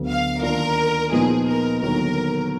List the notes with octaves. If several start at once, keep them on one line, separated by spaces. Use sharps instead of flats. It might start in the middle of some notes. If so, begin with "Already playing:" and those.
Already playing: D2 D3 F#3 B3
F5
D#2 D#3 A#3 D4 F4 A#4
A#2 F3 G#3 B3 D#4 G#4
A#4
D#2 D3 F#3 B3 A#4